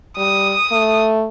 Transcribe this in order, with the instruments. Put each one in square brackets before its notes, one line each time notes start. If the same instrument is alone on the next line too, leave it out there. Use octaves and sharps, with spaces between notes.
[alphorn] G3 [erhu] D#6
[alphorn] A3